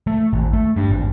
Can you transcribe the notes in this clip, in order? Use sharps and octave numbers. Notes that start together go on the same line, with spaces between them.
A3
G#1
A3
G2
G#1